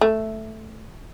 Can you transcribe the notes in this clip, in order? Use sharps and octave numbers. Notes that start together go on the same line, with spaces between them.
A3